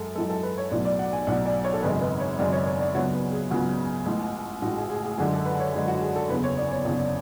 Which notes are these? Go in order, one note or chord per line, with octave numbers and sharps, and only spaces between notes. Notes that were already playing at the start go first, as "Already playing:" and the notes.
Already playing: F#2 G#3 A4
F#2 E3 G#3 A4
A4
B4
C#5
B1 A2 F#3 D5
D5
F#5
G#5
B1 A2 F#3 F#5
D5
C#5
A4
G#1 F#2 C#3 G#3 B4
B4
C#5
G#1 F#2 C#3 G#3 D5
C#5
C#5
D5
C#2 C#3 F#3 B3 C#5
B4
G#4
C#2 C#3 F#3 B3 F#4
A1 A2 G#3
A1 A2 G#3 F#4
G#4
G#4
G#4
F#2 D3 G#3 G#4
A4
B4
C#5
F#2 D3 G#3 G#4
F#4
G#4
A4
F#1 E2 C#3 B4
C#5
D5
C#5
F#1 E2 C#3